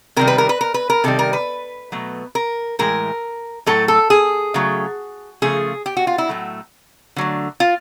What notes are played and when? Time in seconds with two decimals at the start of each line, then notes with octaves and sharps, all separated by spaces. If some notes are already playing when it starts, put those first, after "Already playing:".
0.16 C3 D#3 G3 A#4
0.27 B4
0.38 A#4
0.49 B4
0.61 A#4
0.74 B4
0.90 A#4
1.04 C3 D#3 G3 A4
1.19 A#4
1.33 B4
1.92 B2 F#3 A3
2.35 A#4
2.79 A2 E3 G#3 A#4
3.66 A2 F#3 A3 A4
3.88 A4
4.10 G#4
4.54 C#3 F#3 A3
5.42 C#3 F3 A3 G#4
5.86 G4
5.97 F#4
6.07 F4
6.18 E4
6.29 A2 F#3 A3
7.16 D3 F#3 A3
7.60 F4